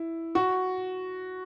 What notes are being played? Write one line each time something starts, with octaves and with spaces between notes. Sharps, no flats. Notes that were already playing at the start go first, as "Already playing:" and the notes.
Already playing: E4
F#4